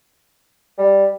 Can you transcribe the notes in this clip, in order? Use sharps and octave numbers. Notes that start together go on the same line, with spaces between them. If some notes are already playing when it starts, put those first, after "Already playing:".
G3